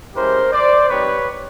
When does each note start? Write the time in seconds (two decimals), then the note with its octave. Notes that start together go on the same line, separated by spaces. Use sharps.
0.15 G#3 C#4 E4 G4 A#4 C5
0.52 C5 D5
0.90 G3 C4 D#4 G4 B4 C#5